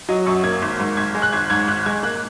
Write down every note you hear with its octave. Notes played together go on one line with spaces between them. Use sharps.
F#3 D#5
F#2 C#6
A#3 G#6
G#1
G#2
G#1 G#6
G#3
F#6
G#1 G#6
G#2 G#6
G#1 F#6
G#3 G#6
A#3 F#6